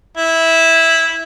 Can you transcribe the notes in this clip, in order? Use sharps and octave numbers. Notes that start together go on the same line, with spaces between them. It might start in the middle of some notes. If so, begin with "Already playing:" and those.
E4